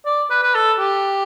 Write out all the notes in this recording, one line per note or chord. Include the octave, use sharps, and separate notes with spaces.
D5
B4
B4
A4
G4